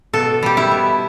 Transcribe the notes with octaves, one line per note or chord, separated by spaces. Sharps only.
B2 A4
G3 G4
E4
B2